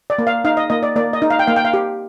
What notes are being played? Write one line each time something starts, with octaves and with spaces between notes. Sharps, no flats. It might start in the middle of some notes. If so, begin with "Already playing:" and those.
D5
A#3
F5
D#4 F5
D#5
A#3 D#5
D5
A#3 D5
D#5
D#4
F5
G5
A#3 F5
G5
F5
G4